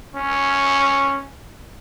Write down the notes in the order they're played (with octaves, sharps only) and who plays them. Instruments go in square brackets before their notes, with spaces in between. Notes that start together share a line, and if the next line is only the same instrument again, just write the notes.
[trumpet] C#4